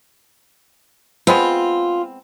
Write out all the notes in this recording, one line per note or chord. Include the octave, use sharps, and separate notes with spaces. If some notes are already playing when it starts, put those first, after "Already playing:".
G#3 B3 C4 F4